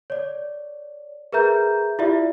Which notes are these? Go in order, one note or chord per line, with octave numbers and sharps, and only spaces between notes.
C#5 D5
G#4 A#4 B4 E5 A#5 G6
E4 F4 G4 D5 E5